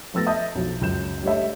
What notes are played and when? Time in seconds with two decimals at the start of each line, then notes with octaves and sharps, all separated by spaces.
0.14 F3 A3 B3 E6 A6 A#6
0.26 D#5 E5 A5 D#6 G6
0.55 B1 F3
0.81 C#2 F#2 G6 E7
1.23 G3 A3 C#5 D#5 E5